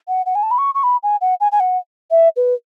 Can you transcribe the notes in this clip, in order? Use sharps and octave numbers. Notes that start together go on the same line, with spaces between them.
F#5
F#5
G#5
A5
B5
C#6
C#6
B5
G#5
F#5
G#5
G#5
F#5
E5
B4